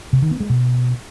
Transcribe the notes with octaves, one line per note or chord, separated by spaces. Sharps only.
C3
D#3
B3
G#3
B2